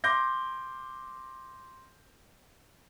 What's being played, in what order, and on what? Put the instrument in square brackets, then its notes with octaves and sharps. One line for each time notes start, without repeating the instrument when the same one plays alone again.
[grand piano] C6 D6 G6 A#6